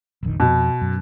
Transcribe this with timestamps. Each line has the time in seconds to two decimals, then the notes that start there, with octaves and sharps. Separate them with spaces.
0.23 F1 A#1 D#3
0.40 F2 B2
0.81 F#2